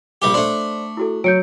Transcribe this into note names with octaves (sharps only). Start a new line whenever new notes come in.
A#1 G3 G4
A3 D4 C5 D5 C6
E4 F#4 A4
F#3 G6 C#7 D7